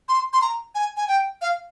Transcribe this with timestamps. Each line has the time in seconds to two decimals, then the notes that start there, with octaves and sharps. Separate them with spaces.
0.09 C6
0.33 C6
0.42 A#5
0.75 G#5
0.97 G#5
1.08 G5
1.41 F5